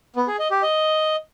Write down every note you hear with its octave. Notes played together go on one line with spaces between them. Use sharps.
B3
G#4
D#5
G4
D#5